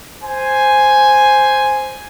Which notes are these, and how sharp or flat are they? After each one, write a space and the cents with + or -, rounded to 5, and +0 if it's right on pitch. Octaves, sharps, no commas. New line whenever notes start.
C5 +0 G#5 +0